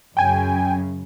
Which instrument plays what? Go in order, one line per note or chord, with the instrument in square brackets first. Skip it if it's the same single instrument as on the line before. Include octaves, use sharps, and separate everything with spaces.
[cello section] F#2 C#3 [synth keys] G5 G#5